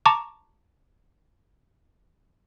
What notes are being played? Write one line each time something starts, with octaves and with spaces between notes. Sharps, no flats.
A5 A#5 C#6 D6